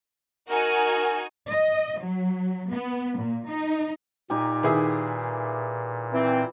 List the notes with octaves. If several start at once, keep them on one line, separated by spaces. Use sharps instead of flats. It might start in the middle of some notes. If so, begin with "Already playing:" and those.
D#4 F#4 A#4 G#5
D#5
F#3
B3
A#2
D#4
A#2 D#4 G4 G#5
D#3 E4 G#4 B4 E5
E3 C4